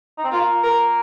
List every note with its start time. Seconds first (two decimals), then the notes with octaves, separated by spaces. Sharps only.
0.18 D#4
0.24 C4
0.31 A#3 F4
0.63 A#3 A#4